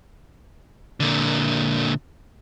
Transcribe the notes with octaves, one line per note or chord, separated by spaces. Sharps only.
A#2 D3